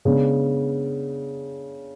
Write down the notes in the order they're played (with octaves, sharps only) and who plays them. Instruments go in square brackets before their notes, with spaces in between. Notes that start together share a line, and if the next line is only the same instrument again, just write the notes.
[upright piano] C#3 G#3 B3 D4